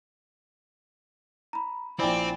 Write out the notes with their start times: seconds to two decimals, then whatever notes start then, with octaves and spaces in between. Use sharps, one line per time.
1.53 A#5 B5
1.99 A#1 C4 E4 D5 G5 G#5 B5